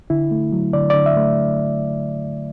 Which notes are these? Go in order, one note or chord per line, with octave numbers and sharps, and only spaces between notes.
D3 E4
A3
F#3
D3 D5
D3 D5
E5
A3